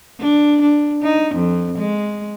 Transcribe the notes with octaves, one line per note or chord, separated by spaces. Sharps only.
D4
D4
D#4
F2
G#3